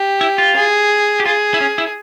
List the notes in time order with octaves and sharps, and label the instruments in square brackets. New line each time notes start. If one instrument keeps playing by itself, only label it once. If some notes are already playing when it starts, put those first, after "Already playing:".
Already playing: [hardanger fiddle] G4
[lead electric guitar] E4
F4
[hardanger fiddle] G#4
[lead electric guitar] G4
[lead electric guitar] F4 [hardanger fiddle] G#4
[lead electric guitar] E4
C#4
E4